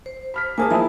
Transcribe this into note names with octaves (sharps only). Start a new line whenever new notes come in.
C5
B5 F6 B6
A#3 G#4 C5 G#5 A5 D#6
F3 E4 G#5 B5